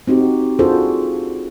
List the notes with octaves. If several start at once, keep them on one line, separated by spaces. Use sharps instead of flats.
C4 D#4 F#4 G4
D4 F4 F#4 G#4 A4 C5